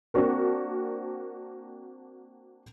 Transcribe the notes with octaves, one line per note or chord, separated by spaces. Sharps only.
A#3 C4 D4 F#4 A#4